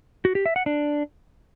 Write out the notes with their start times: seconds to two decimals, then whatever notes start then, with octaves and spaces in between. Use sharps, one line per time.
0.25 F#4
0.35 G4
0.46 E5
0.56 F#5
0.66 D4